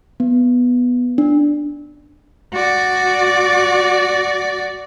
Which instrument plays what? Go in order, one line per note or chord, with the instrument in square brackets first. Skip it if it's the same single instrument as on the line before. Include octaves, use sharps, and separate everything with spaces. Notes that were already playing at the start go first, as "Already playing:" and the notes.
[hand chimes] B3
D4
[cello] F#4 D5